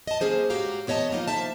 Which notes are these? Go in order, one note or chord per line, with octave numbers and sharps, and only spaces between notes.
D#5 A5
A#3 C#4 G#4 C5
G#2 F#4 G4 C#5 F5 A#5
E2 B3 C#5 D#5 A5
F3 A#3 D#4 F4 A#4 D#5
A#3 C5 E5 A5